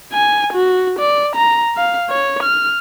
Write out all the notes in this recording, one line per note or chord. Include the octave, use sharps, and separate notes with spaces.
G#5
F#4
D5
A#5
F5
C#5
F6